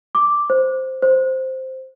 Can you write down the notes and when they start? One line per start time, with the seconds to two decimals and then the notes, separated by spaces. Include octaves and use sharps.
0.15 D6
0.50 C5
1.02 C5